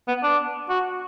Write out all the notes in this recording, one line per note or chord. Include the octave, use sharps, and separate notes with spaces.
B3
D4
F#4